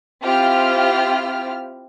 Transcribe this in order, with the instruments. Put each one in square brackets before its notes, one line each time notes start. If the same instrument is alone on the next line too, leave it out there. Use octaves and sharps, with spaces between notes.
[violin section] C4 E4 F4 G4 F6